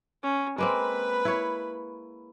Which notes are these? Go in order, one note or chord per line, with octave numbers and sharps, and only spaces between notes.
C#4
G#3 A#3 C4 B4 B5
E4 C#5